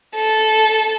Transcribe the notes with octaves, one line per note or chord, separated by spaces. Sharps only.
A4